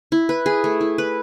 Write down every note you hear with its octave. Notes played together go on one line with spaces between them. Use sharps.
E4
B4
G#4
A3
E4
B4